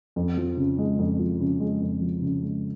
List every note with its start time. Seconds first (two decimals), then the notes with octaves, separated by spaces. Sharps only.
0.16 F2
0.38 F3
0.57 C#3
0.78 G#3
0.99 F2
1.19 F3
1.40 C#3
1.60 G#3
1.81 F2
2.01 F3
2.22 C#3
2.43 G#3